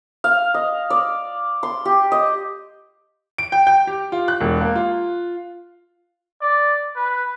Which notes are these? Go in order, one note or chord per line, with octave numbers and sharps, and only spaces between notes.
F5
D#5
D5
C6
G4
D#5
D7
G5
G5
G4
F4
F#6
E1
A#3
F4
D5
B4